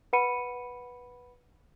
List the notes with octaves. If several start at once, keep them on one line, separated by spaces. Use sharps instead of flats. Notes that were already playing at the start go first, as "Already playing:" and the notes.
B4 F#5 B5 C#7 D#7